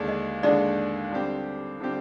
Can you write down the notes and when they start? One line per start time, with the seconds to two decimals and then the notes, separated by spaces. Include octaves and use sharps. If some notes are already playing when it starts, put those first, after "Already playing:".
Already playing: D#2 D3 G#3 D4
0.08 D#5
0.43 D#2 D3 G#3 D4 D5
1.12 D3 G3 C4 G4
1.80 D3 G3 C4 G4